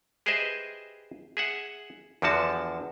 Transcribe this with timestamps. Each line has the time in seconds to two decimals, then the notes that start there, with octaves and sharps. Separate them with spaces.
0.26 G4 G#4 B4 C5 D#5 E5
1.37 G#4 E5 F#5
2.22 E2 D3 F3 F#4 A5